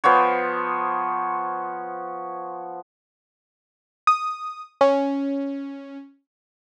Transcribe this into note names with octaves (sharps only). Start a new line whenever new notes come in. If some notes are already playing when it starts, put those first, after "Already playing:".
F3 B3 C5 C#5
D#6
C#4